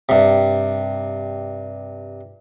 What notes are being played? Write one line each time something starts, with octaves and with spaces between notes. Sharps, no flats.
G2 C3